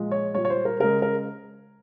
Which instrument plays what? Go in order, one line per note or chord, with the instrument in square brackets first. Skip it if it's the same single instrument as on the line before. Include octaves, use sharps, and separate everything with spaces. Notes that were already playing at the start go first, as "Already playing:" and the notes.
Already playing: [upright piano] A#2 F3 G#3
C#5
A#2 G3 C#5
C#5
C5
A#4
C#3 G#3 A#4
A#4